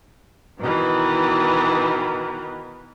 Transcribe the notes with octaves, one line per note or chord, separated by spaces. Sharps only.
B2 D#3 E3